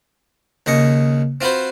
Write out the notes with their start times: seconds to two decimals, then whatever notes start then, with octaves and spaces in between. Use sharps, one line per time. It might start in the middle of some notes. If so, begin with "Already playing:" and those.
0.66 D#2 C#3 D#5 C#6
1.41 C4 F4 F#4 B4 C5